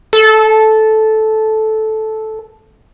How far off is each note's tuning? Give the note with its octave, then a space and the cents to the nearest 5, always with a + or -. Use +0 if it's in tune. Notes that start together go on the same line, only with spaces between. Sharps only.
A4 -10